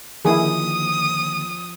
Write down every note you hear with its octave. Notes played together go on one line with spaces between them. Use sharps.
D3 D#3 F3 A#3 E4 G#4 D#6